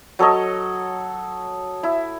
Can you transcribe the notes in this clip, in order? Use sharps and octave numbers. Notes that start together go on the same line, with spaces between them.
F#3 A4 C#5 D#5
E4